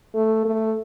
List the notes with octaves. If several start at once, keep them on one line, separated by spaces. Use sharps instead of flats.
A3
A3